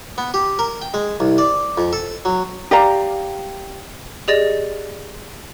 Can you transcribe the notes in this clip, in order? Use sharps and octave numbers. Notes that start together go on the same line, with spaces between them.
B3
G4
A#4
G5
G#3
C2
D5
F2
A4
F#3
G4 D5 F5 A#5
G4 G#4 D5 D#5 A6